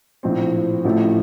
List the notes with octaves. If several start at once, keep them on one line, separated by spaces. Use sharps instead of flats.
A#1 A2 F3 C4
A1 A2 F3 A3